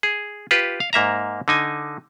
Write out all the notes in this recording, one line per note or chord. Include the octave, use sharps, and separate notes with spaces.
G#4
F4 G4 B4
F5
G#2 A#3 E5 A#5
D3 D#4 G#5